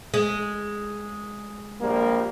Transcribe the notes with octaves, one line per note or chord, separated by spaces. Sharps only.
G#3
A#1 G3 A#3